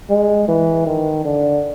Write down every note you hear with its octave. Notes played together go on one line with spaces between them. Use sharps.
G#3
E3
D#3
D3